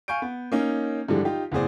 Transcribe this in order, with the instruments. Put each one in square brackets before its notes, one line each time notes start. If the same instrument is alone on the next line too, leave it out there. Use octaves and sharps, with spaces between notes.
[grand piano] F5 G#5 C#6 G6 D7
B3
A#3 C#4 D#4
G2 D3 E3 F3 G3 G#3
D#4 F4 G4
F#1 A2 B3 G#4 C5 D5